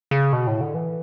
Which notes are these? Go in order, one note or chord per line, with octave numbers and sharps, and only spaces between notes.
C#3
B2
A2
D3
E3